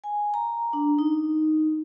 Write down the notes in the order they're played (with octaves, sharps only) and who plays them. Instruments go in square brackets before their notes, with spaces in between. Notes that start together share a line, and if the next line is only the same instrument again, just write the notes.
[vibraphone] G#5
A#5
D4
D#4